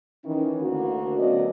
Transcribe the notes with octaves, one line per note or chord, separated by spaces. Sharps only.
D#3 E3 C#4
D2 D3 A#3 F#4
D2 F#3 B3 C#4 D5 D#5